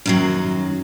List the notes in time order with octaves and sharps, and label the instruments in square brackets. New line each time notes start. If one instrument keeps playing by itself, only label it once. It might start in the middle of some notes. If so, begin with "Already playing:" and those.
[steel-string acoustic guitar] F#2 D#3 F#3